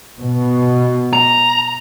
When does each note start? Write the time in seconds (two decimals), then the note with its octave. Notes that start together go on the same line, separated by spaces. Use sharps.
0.20 B2
1.13 A#5